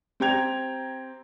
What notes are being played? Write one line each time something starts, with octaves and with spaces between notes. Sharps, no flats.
C4 G4 G5 A#5 G#6 F7